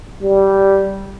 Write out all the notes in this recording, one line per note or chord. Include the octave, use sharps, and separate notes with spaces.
G3